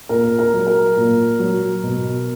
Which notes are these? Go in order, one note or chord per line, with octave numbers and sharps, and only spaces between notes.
A#2 A#4
A#4
F#3
A#4
A#2
F#3
B2